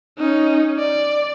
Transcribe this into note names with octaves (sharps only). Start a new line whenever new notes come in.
C#4 D#4
D5